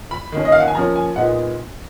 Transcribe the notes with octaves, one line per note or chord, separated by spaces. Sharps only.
B5
D#3 A#3 C#4
D#5
F5
F#5
G#5
F3 A#3 C#4 A#5
G#5
A#2 G#3 B3 D#4 F#5